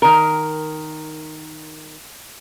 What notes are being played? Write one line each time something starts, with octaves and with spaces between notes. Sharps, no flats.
D#3 A#4